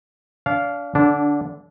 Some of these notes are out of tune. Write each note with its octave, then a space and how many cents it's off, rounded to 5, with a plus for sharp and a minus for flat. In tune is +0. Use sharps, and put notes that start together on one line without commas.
D4 -35 F5 +0
D3 +0 D4 -20